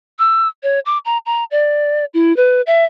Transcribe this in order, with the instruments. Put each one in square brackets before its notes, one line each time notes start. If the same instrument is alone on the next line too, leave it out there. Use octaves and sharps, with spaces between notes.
[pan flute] E6
C#5
D6
A#5
A#5
D5
E4
B4
E5